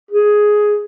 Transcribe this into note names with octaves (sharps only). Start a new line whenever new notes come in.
G#4